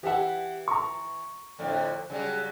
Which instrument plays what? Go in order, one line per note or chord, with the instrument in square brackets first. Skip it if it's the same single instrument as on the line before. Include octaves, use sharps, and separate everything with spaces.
[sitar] E3 E5 [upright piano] G4 F#5
[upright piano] A#5 C#6
[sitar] F2 A2 D3
C#3 F#3 G3